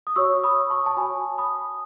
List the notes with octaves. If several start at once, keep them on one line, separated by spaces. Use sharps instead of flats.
D#6
F#4 C#5 C#6 E6
B5 D#6
A5 C#6
A5
F#4 C#5 G#5 B5
B5 D#6